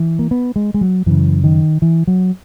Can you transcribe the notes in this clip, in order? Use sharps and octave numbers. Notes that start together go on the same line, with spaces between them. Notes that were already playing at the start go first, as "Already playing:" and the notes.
Already playing: E3
A#3
B3
G#3
G#3
F#3
F#2 C#3 E3
D#3
E3
F#3